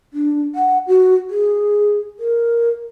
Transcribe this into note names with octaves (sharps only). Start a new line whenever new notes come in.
D4
F#5
F#4
G#4
A#4